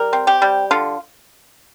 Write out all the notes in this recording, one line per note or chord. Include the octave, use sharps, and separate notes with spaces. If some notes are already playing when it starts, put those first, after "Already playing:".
Already playing: G3 A#4
C4
G4
G3
D3 F4